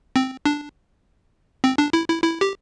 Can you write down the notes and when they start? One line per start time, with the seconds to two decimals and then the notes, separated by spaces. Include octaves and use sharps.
0.16 C4
0.46 D4
1.64 C4
1.78 D4
1.93 E4
2.09 E4
2.23 E4
2.41 G4